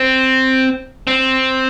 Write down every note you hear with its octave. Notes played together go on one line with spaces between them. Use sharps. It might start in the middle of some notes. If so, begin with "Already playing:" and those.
Already playing: C4
C4